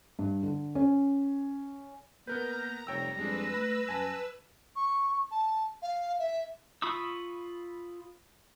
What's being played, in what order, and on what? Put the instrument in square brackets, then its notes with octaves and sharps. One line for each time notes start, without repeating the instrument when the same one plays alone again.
[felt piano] G2
D3
C#4
[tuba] A#3 [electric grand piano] B3 A#4 B4 [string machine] A#5 [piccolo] G6
[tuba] F1 [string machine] G3 [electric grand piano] C#5 G5 E6 [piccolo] A#6
[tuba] F2 [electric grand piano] G#3 D4 [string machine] B4 E6
[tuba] A3 [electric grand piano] B5
[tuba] F#2 [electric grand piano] G#5 A5
[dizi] C#6
A5
F5
E5
[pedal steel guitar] F4 B5 C#6 D#6 E6